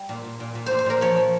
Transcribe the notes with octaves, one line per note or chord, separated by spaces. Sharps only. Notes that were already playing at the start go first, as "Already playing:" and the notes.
Already playing: G3
A#2
A#2
A#2
A#2
A#2 C5
C5
A#2 A#4
F3 C#5
F3